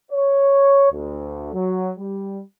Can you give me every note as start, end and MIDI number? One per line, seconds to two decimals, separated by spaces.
0.12 0.88 73
0.92 1.52 38
1.53 1.92 54
1.97 2.40 55